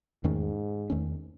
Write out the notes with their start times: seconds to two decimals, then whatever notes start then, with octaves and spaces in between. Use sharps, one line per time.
0.23 E2 G#2 D#3 A3 C#4
0.90 E2 D#3 A3 C#4